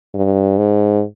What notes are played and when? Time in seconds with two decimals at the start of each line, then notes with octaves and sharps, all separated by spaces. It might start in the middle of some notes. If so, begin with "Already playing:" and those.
0.14 G2
0.58 G#2